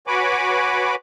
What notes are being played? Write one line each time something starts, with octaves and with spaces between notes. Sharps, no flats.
F#4 B4 C#5 G#5 B5 D6